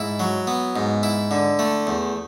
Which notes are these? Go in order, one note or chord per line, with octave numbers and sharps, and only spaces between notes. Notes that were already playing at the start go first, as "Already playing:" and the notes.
Already playing: G#2 E4
F#3
B3
G#2
E4
D3
A3
E2